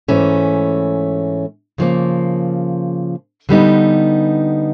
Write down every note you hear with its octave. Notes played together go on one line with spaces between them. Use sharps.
G#2 E3 A3 C#4
C#3 F3 A#3
D3 G3 B3 D#4